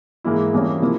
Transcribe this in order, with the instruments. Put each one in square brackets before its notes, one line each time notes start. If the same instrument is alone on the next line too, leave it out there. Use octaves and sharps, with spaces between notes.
[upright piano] G#2 E3 A#3 E4
F2 E3 G3 A#3 C#4
C3 F3 A#3 E4